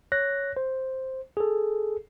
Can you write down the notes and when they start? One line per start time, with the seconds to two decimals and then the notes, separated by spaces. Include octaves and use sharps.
0.12 C#5 F#6 A#6
0.57 C5
1.37 G#4 A4